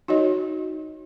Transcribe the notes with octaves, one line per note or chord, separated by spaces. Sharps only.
D#4 F#4 C#5 D#5